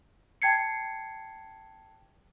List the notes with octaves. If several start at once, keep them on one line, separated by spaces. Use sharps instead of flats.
G5 A5 G#6 C7 C#7